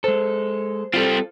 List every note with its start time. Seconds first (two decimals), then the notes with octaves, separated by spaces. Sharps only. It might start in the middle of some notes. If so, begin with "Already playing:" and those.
0.04 G#3 A4 C5
0.94 G3 C4 F4 A4